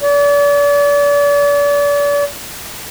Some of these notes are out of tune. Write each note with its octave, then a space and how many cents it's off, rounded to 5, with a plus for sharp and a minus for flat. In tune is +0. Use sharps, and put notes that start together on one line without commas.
D5 -40